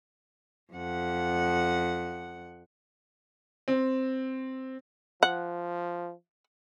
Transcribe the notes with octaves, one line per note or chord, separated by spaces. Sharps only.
F2 F#5
C4
F3 F#5